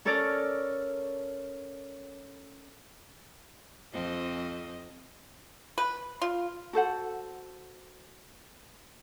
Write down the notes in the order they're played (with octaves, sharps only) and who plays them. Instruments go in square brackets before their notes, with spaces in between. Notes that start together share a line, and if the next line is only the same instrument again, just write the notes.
[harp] C#4 A4 A#4 C#5 D5
[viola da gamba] F2 C4 D#5
[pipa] B4
F4
[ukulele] F#4 A4 C5 F#5